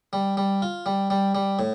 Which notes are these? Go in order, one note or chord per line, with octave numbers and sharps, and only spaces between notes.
G3
G3
F4
G3
G3
G3
A2